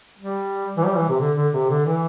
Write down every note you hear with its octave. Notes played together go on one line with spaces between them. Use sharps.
G3
E3
G3
E3
C3
D3
D3
C3
D3
E3